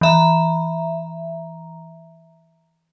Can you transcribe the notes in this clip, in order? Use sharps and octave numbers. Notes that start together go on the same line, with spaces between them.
E3 E5 A#5